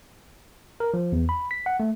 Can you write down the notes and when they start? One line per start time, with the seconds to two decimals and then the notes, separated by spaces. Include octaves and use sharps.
0.80 A#4
0.94 F3
1.12 E2
1.29 B5
1.51 B6
1.66 F#5
1.80 A3